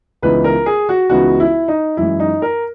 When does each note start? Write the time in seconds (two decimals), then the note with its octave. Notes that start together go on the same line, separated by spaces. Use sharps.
0.22 C#2 C#3 E3 B3 D#4 B4
0.44 A#4
0.66 G#4
0.89 F#4
1.10 C#2 C#3 E3 B3 D#4 F#4
1.40 E4
1.68 D#4
1.97 F#2 E3 G#3 E4
2.20 D#4
2.42 A#4